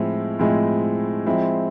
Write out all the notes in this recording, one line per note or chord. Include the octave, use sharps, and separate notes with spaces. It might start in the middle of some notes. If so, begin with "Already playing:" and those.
Already playing: A2 F3 G#3 C4 E4
A2 F3 G#3 C4 E4
F3 G#3 C4 E4